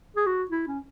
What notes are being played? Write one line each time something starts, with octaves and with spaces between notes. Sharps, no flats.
G#4
F#4
E4
C#4